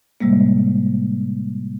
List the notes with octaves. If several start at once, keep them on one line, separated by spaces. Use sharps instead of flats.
A2 C3 G3 G#3 A#3